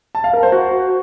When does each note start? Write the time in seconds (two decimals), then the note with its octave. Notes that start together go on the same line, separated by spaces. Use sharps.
0.15 A5
0.24 F5
0.33 A#4
0.43 C5
0.52 F#4